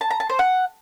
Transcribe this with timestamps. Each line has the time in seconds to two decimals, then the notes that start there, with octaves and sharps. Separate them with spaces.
0.01 A5
0.10 A#5
0.20 A5
0.29 C5
0.39 F#5